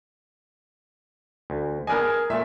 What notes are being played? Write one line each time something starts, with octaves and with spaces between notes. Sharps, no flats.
D2
B3 D4 A#4 D#5 G#5
G#4
A#2 A3 E5